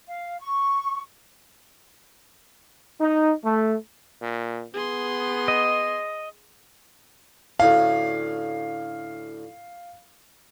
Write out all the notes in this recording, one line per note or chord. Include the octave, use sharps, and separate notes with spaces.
F5
C#6
D#4
A3
A#2
B3 G#4 C6
D#5
D2 A2 C#4 F5